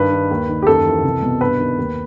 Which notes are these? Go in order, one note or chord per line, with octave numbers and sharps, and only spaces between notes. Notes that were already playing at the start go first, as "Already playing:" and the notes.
Already playing: G2 D#3 B4
D#3
D#2
D#3
G4
F#2 A4
E3
C2
B2
G2 B4
D#3
D#2